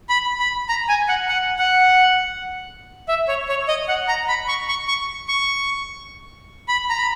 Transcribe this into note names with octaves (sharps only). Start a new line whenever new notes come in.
B5
B5
A#5
G#5
F#5
F#5
F#5
E5
C#5
C#5
D#5
F#5
A#5
B5
C#6
C#6
C#6
C#6
B5
A#5
B5